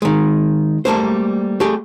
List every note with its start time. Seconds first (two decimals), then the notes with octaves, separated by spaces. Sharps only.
0.02 D#3 G#3
0.85 G3 A3 A#3 C5
1.60 A3 G4 G#4